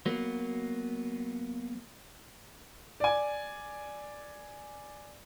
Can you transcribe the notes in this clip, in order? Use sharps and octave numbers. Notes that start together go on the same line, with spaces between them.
F#3 A#3 B3
D5 G#5